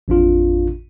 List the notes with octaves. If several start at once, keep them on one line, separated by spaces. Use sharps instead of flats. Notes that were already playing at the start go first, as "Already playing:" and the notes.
A1 F2 D4 F4